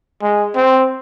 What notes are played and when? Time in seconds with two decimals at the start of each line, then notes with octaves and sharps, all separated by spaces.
0.22 G#3
0.55 C4